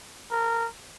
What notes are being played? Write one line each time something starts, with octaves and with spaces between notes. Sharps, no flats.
A#4